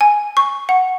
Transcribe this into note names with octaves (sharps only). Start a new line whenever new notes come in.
G#5
C#6
F#5